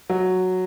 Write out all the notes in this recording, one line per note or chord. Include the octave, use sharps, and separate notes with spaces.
F#3